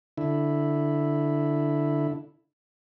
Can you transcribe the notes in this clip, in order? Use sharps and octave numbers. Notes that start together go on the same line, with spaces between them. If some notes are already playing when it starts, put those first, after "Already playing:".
D3 E4